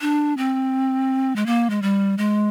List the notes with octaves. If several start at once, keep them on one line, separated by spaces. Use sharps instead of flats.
D4
C4
G#3
A#3
G#3
G3
G#3